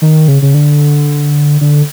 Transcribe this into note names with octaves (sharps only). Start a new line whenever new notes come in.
D#3
C#3
C#3
D3
D3